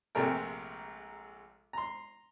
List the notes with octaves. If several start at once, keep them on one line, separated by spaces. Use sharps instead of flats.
A#1 C3 G#3 A3 A#4 G5
A#5 C6